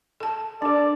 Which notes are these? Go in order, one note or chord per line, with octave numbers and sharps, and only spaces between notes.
A4 A5
D4 A4 D5